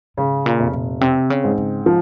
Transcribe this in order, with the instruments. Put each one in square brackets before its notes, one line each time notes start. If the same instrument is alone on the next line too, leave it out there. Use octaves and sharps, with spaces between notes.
[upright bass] G#2 [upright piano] C#3
[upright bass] A#2
[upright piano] F1
[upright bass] A#2
[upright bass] C3 [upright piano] C4
[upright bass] C#3
[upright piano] G#2
[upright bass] C#3
[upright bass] C#3 [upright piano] F3